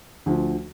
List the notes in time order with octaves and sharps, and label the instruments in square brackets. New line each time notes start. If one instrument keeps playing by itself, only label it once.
[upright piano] D2 D3 F3